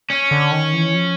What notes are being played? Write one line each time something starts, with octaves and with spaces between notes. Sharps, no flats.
C#4
D3
D#3
E3
F3